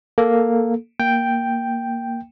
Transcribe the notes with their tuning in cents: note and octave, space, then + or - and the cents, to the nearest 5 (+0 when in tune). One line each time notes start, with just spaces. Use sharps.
A#3 +0 A4 +0
A#3 +0 G5 +0